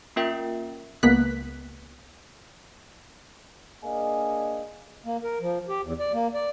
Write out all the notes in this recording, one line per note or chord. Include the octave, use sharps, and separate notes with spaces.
A#3 C#4 F4 A#4 E5 G5
C#2 A#3 B3 F#6 B6
A#3 D4 G#4 D#5 F5 G#5
A#3
A#4
F3
G4
E2
D5
A#3
D5